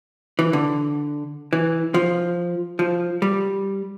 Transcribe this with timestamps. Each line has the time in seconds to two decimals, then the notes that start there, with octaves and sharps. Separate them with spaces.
0.39 E3
0.53 D3
1.53 E3
1.94 F3
2.79 F3
3.22 G3